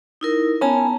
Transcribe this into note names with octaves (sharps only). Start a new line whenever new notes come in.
D#4 E4 A#4
B3 C#4 A5 A#5